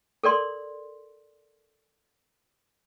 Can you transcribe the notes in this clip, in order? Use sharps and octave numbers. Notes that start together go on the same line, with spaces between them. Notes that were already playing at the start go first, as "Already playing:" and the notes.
A4 A#4 D5 C6